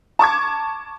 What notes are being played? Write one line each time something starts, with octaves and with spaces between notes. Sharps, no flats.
A5 C#6 D6 G#6